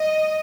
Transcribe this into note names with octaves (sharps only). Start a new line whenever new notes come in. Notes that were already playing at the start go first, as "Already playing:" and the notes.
Already playing: D#5